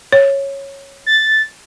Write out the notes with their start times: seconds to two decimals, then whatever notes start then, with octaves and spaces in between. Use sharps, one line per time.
0.12 C#5
1.06 A6